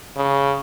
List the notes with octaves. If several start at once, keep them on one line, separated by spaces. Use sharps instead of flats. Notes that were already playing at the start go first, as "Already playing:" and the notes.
C#3